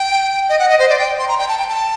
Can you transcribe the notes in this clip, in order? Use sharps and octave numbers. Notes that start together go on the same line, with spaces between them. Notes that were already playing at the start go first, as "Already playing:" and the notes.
Already playing: G5
D#5
F#5
D#5
C5
D5
G5
C6
A#5
G5
A5
G5
A5